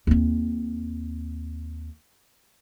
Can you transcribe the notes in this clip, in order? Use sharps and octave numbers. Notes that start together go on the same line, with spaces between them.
D#2 C4